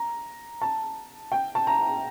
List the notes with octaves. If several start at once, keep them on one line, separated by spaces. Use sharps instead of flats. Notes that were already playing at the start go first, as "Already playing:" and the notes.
Already playing: A#5
A5
G5
A5
A#5